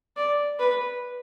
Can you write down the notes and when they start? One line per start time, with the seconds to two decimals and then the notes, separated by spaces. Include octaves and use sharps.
0.17 D5
0.59 B4